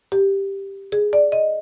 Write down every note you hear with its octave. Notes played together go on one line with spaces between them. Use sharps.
G4
G#4
D5
D#5